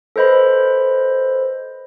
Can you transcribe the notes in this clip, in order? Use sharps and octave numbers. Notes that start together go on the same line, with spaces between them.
A4 B4 C5 D#5 B5